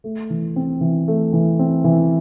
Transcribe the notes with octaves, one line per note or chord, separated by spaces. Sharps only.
A3
E3
C4
E3
A3
E3
C4
E3